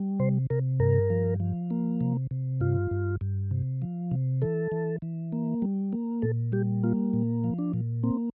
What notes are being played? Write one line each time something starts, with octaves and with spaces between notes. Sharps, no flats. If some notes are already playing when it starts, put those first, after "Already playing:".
Already playing: G3
C3 C5
C3 A#4
G2 A#4
F3
F3
A#3
C3
C3
G2 F4
G2
G2
C3
F3
C3
E3 A4
E3
E3
A#3
G3
A#3
A#2 A4
G3 G4
A#3 F4
A#2
F3
D4
A#2
A#3 C4